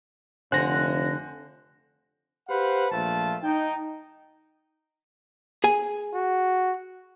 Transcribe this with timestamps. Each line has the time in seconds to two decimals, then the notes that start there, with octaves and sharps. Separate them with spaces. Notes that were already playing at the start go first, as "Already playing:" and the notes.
0.52 F1 D3 C5 F#5 G#5 F#6 A#6
2.48 G4 B4 C5 F5 F#5
2.91 A#1 A3 F4 A5
3.43 D#4 G5
5.64 G#4 G#5
6.14 F#4